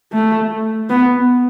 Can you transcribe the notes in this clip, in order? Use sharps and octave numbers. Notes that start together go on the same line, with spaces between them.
A3
B3